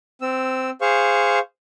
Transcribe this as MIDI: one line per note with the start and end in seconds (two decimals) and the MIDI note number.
0.22 0.70 60
0.22 0.70 88
0.81 1.39 68
0.81 1.39 72
0.81 1.39 77
0.81 1.39 85